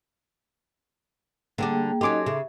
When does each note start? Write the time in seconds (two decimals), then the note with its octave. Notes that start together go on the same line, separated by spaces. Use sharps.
1.58 D3 G3 A#3 D4 G#4 G5
2.01 F#3 C#4 D#4 G4 A4 D#5 C6 D6
2.26 C#3 E5